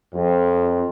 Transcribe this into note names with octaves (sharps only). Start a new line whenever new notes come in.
F2